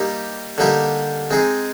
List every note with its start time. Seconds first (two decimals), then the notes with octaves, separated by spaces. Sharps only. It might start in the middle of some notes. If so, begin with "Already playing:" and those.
Already playing: G3 A#3 D#4 G4
0.58 D3 G3 A#3 D#4 G4
1.31 G#3 C4 D#4 G#4